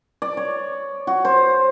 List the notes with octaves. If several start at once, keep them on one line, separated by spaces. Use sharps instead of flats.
D5
C#5
F#4
C5